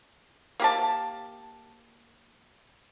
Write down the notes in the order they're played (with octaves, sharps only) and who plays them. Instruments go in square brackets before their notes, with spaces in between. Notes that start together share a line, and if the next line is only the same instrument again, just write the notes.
[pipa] A#3 G4 A5